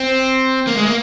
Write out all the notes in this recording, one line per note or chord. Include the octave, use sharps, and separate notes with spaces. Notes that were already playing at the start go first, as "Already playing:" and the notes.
Already playing: C4
A#3
G#3
A#3